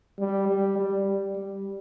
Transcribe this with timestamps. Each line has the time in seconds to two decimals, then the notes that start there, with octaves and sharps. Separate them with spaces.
0.19 G3
0.48 G3
0.78 G3
1.36 G3